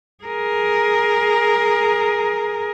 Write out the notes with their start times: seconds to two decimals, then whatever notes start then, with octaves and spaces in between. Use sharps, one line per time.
0.24 G#4 A#4